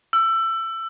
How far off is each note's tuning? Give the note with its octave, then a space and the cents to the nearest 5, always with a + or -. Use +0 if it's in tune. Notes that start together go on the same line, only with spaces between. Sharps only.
E6 +20